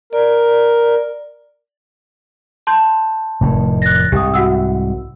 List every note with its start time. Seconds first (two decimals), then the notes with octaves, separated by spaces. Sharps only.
0.13 A#4 D5
2.67 A5 C6 G6
3.41 F1 A2 D#3
3.82 F#6 A6 A#6
4.12 C2 G#2 G4 D#6
4.34 F#4 F#5 E6